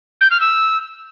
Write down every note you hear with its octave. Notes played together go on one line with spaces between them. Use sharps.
G6
F6
E6